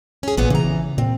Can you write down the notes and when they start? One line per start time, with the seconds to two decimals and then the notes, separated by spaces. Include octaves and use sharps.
0.23 C#4 G#4
0.37 A1 A#2 B3 C#4
0.50 C#3 E3 A#5
0.98 A#2 C4